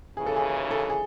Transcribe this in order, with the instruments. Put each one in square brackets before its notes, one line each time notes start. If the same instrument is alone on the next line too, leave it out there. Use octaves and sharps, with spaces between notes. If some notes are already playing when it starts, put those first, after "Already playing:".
[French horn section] D#2 C#3 E3 [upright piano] G#4
[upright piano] A4
G#4
A4
G#4